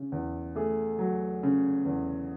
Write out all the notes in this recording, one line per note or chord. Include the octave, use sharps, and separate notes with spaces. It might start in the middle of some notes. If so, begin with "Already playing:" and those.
Already playing: C#3
E2
A3 G#4
F#3
C#3
E2